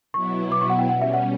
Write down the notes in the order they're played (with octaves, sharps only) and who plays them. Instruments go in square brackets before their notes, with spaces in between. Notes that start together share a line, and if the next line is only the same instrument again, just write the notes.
[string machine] B2 F#3 B3 E4 [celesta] C#6
[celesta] D6
C#6
F#5
G5
[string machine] B2 G3 C#4 [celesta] F#5
[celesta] E5
F#5